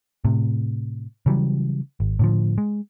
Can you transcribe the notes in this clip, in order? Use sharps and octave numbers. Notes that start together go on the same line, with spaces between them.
A2 C3
C#3 E3 F#3 G3
G#1
A2 D3 F3
G#3